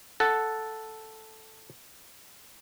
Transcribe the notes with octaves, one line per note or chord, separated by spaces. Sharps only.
A4 F#5